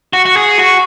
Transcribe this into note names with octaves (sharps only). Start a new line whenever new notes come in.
F#4
F#4
G#4
F#4